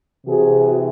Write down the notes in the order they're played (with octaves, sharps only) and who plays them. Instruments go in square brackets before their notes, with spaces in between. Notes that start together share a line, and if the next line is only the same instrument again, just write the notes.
[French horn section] C3 E3 F#4 G#4